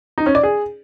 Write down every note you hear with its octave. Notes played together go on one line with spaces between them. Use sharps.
D#4
C#4
D5
G#4